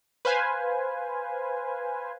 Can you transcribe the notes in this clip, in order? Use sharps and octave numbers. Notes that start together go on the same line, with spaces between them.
B4 C5 F5 G#5